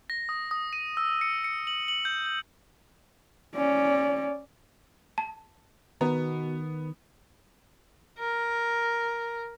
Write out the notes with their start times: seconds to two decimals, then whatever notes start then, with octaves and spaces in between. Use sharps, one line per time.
0.10 A#6
0.29 D#6
0.51 D#6
0.73 D#7
0.97 E6
1.21 C#7
1.44 C#7
1.67 F#7
1.88 F#7
2.05 G6
2.26 G6
3.56 C#4 D5
5.18 A5
6.01 B2 D#3 B3 A#5
8.19 A#4